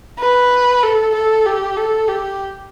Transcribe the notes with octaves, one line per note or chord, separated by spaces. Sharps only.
B4
A4
A4
G4
A4
G4